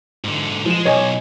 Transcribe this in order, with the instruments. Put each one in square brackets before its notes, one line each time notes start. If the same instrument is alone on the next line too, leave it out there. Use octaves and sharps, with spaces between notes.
[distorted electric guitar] G#2 D3
[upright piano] F3 E7 [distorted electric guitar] G#3
[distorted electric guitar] B1 [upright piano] C#5 D#5 G#5